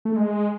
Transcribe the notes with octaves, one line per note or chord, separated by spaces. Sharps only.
A3
G#3